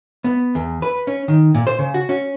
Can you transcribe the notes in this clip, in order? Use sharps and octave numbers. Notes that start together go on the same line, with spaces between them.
B3
E2
B4
C#4
D#3
A#2
C5
C#3
F#4
C#4